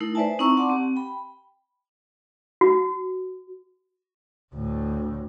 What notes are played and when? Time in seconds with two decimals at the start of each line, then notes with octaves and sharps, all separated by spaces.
0.01 A3 D#4 E4 A#4
0.15 B4 C5 D5 E5 G#5 A5
0.39 C4 D#4 E4 A#5 C#6 E6
0.57 D5 F#5 A5 C6 D6
0.70 C4 G4
0.96 G5 B5
2.61 F#4
4.54 D2 A2